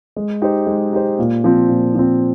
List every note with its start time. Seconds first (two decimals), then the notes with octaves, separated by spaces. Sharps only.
0.16 G#3
0.42 D#4 G4 C5
0.67 G#3
0.93 D#4 G4 C5
1.19 A#2
1.44 F3 C4
1.69 A#2
1.95 F3 C4